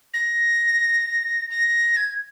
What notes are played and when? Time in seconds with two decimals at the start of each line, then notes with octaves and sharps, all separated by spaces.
0.13 A#6
1.50 A#6
1.96 G#6